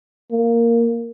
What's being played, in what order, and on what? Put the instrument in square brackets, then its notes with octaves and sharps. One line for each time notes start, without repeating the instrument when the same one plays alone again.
[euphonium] A#3